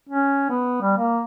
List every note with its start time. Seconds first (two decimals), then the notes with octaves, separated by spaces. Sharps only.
0.09 C#4
0.50 B3
0.82 G3
0.97 A#3